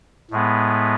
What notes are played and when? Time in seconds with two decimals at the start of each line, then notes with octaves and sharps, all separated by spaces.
0.31 A2 G#3 B3